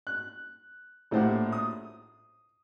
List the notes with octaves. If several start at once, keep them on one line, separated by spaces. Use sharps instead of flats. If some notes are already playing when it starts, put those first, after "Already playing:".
F#6
A#1 A2 E4 G4 C5 F#5
D#6